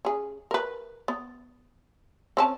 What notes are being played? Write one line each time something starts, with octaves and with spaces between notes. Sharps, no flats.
C#4 G#4
A#4 B4
B3
C4 C#4 A5